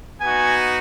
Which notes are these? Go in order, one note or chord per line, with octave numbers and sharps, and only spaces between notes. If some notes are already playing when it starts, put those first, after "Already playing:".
B3 D#4 F#4 G#5